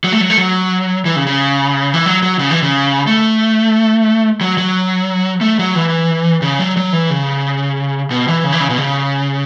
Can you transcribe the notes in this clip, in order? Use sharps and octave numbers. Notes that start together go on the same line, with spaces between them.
F#3
A3
F#3
A3
F#3
E3
C#3
C#3
E3
F#3
F#3
C#3
E3
C#3
A3
F#3
F#3
A3
F#3
E3
C#3
F#3
F#3
E3
C#3
B2
E3
C#3
E3
C#3
B2
C#3